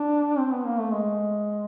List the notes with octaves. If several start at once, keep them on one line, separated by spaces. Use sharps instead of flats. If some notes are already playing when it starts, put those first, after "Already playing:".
Already playing: D4
C4
B3
A#3
A3
G#3